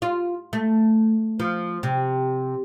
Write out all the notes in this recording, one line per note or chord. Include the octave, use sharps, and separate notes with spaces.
F4
A3
F3
C3